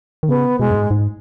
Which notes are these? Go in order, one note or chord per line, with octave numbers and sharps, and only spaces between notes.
D#3
C#3 B3
B2 G#3
F#2
G#2
G#2